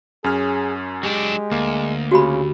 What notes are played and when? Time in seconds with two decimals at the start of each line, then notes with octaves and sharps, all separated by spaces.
0.24 F#2 C#4 G#4 F6
1.03 F#3 G#3 D4 G4
1.51 D2 A#3
2.11 C#3 F#4 G4 B5